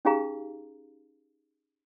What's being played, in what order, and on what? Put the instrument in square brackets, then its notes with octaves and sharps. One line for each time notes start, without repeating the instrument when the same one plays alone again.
[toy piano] C#4 D#4 G4 G#4 F5 A#5